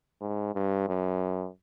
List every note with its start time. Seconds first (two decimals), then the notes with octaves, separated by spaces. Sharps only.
0.21 G#2
0.55 G2
0.88 F#2